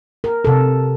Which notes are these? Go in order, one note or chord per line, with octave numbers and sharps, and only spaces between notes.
A#4
C3 A4